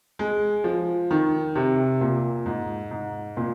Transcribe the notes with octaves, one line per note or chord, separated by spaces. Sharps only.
G#3
F3
D#3
C3
A#2
G#2
G#2
A#2